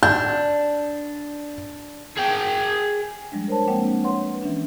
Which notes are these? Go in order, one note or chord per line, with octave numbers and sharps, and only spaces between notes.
D4 G6
G#4 G5
F3 G3 G#3 D4
A#4 C5 C#5 A5
G#3 A#3 C4 D4 F#5 G5
B4 C#5 F#5 C6
E3 C#4 D4